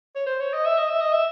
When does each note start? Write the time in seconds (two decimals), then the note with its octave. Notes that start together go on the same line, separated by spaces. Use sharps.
0.15 C#5
0.26 C5
0.40 C#5
0.54 D#5
0.65 E5
0.78 D#5
0.89 E5
1.00 D#5
1.12 E5